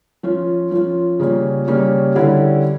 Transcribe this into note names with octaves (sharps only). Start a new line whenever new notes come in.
F3 C#4 F4
F3 C#4 F4
C#3 G3 A#3 C#4
C#3 G3 A#3 C#4
D3 G3 C#4 E4